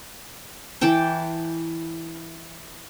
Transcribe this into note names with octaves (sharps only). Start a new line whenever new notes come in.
E3 G5 A5 D6